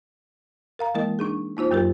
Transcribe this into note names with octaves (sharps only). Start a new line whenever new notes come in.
A#4 F5 A#5
E3 G#3 A#3 E4 A#4 D#5
D4 D#4 G#4
A#3 D#4 F4 C5
F#2 F#3 F4 G4 A#4